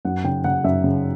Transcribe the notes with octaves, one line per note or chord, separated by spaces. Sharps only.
F#2 F#5
C#3 G5
C#3 F#5
F#2 E5
C#3